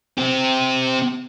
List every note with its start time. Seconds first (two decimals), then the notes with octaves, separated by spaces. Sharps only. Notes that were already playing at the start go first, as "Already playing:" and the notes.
0.18 C4 G4